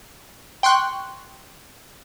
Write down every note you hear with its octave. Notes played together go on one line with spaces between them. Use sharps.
G5 C6 C#6 F#6